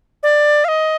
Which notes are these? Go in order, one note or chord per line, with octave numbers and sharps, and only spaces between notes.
D5
F5
D#5